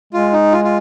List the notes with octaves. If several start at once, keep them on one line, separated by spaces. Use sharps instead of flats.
G#3 F4
D#4
F4
F4